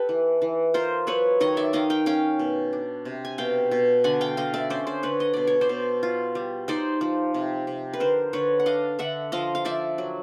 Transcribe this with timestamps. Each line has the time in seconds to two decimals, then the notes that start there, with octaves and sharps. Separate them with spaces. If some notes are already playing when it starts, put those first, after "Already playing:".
Already playing: G4 A4 B4
0.09 E3
0.42 E3
0.74 F4 A#4 C5
1.07 F#3 B4 C#5
1.40 D#3 C#5 D#5
1.57 D5 E5
1.73 D#3 D#5 F5
1.90 F5 G5
2.06 C#4 F5 G5
2.39 B2
2.73 D4
3.05 C3
3.25 G#5
3.38 B2 F5 G5
3.71 B2
4.04 D3 F#5 G#5
4.21 F5 G5
4.37 D3 D#5 F5
4.54 D5 E5
4.70 C#4 C5 D5
4.87 C5 D5
5.03 D3 B4 C#5
5.20 D#5
5.33 B2 D5
5.47 C#5
5.61 C5 D5
5.69 B2
6.03 F4
6.35 G3
6.68 D#4 C5 D5
7.01 F3
7.34 C3
7.67 C3
7.93 B4
8.00 D3 A#4 C5
8.33 D3 B4 C#5
8.59 F#5
8.66 D4 D#5 F5
8.99 D3 E5 F#5
9.32 F3 D#5 F5
9.55 F5
9.65 F3 D5 E5
9.98 F#3